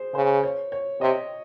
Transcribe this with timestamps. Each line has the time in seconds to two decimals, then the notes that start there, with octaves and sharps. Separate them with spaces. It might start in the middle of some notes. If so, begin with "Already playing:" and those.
Already playing: G#4 C5
0.14 C#3 C5
0.43 C#5
0.72 C#5
1.01 C3 D#5